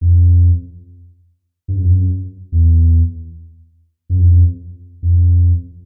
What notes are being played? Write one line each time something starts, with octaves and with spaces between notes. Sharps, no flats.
F2
G2
F#2
F2
F#2
E2
F#2
F2
F2